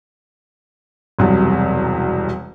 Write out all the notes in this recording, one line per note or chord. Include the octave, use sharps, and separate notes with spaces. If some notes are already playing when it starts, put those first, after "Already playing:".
E1 C2 F#2 C3